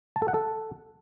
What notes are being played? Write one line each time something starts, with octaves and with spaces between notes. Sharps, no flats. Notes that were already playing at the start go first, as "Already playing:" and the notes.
A5
A4
F#5
A4